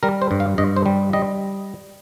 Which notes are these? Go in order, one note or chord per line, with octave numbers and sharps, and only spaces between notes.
G3 A#4
C5
G2
F5
G2 D#5
C5
G3
G3 D#5